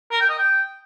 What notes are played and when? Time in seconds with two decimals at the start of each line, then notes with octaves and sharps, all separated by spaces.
0.11 A#4
0.20 G5
0.29 D#5
0.39 G5